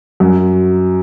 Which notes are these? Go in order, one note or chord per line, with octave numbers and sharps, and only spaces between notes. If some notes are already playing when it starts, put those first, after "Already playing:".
F#2